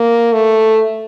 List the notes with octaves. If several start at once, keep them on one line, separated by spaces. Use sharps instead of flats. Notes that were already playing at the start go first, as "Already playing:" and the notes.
Already playing: A#3
A3